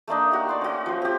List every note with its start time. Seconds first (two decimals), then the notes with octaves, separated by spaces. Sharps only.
0.08 A3 A#3 D4 D#4
0.32 F#4 G4
0.49 D5 C6
0.61 C#4 F#4
0.86 F3 C5
1.02 C4 G4